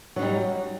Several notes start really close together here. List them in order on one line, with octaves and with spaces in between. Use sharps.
F#3 D#4 G3